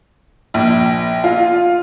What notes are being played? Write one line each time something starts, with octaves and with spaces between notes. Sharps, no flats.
A#1
F4